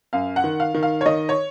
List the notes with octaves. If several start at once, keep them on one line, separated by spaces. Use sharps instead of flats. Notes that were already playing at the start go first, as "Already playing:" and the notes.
F#2 F5
F#5
D#3
F5
D#3
F5
C#5
D#3 D#5
C#5